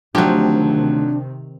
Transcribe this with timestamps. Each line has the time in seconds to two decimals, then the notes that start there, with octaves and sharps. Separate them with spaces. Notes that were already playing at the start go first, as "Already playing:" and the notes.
0.15 D2 C3 D#3 F3 F#3 C4 D4 G4